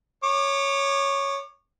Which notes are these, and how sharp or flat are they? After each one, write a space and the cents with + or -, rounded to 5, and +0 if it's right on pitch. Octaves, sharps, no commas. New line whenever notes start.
C#5 +0 D6 +35